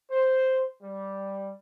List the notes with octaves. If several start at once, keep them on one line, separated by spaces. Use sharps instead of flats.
C5
G3